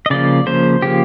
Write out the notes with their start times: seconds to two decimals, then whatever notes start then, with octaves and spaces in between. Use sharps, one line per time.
0.06 D#5
0.10 C#3 F3 A#3 D5
0.46 C#3 F3 A#3 C5
0.82 C#3 F3 A#3 G4